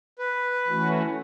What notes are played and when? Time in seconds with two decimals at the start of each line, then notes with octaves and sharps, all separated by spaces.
0.18 B4
0.67 E3 A3 C#4 F#4